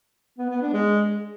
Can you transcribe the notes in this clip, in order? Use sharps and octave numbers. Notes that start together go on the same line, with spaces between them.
B3
B3
D4
G#3